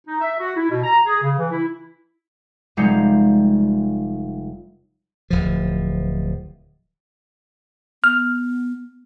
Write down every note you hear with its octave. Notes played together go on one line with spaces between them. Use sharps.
D#4
E5
F#4
E4
B2
A#5
G#4
C#3
E3
E4
F1 G3 G#3 D#4 F5 C#7
D1 F3
B3 F6